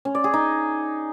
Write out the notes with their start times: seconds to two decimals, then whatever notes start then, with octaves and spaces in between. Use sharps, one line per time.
0.05 C#4
0.15 D5
0.24 G#4
0.34 D#4